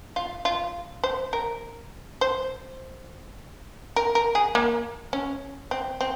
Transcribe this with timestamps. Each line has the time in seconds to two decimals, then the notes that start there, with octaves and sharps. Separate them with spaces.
0.16 F4
0.45 F4
1.04 C5
1.33 A#4
2.21 C5
3.96 A#4
4.15 A#4
4.35 G#4
4.55 A#3
5.13 C#4
5.71 C4
6.01 C4